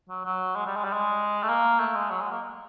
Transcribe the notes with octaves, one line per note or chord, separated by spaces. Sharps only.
F#3
F#3
G#3
G3
G#3
G3
G#3
A3
A#3
A3
G#3
F#3
G#3
A#3